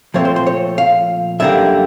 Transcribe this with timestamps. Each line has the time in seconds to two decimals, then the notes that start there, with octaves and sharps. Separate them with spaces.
0.14 A#2 F3 A3 C4 C#5
0.25 C5
0.36 C5
0.46 C#5
0.78 F5
1.40 F#2 D3 G3 A#3 E5